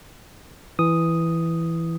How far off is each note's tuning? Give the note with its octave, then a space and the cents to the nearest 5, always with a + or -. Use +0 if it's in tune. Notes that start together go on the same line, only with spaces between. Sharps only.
E3 +5 D#6 +0